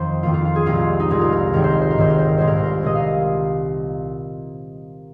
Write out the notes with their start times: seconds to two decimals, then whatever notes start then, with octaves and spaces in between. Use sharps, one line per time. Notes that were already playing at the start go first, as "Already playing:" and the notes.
Already playing: F2 D#3 C5 F5
0.23 F2 D#3 A#3 F4
0.34 F4
0.45 F4
0.55 G#4
0.66 C2 A#2 G#3 F4
1.00 D#4
1.10 C2 A#2 G#3 F4
1.21 A#4
1.32 A#4
1.53 G#1 G#2 D#3 A#4
1.64 C5
1.72 A#4
1.81 C5
1.91 A#4
1.98 G#1 G#2 D#3 C5
2.10 A#4
2.19 C5
2.29 A#4
2.38 C2 A#2 G#3 C5
2.47 A#4
2.56 C5
2.66 A#4
2.83 C2 A#2 G#3 D#5
2.95 F5